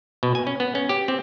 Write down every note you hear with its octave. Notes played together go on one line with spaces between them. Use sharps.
B2
G#5
C#4
B3
C#4
G4
C4